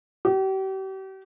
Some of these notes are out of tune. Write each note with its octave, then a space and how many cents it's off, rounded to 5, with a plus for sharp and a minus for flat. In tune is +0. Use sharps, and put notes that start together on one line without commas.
G4 -40